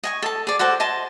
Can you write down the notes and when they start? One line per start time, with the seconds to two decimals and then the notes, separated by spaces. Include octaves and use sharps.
0.03 D#5 G#5 C#6
0.22 A4 A5
0.47 G#4 D5
0.59 F#4 A4 C5 D5
0.80 D#5 G#5 A5 C6